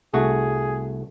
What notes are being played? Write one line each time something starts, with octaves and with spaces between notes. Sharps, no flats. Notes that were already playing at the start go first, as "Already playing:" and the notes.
C2 A3 F#4 G#4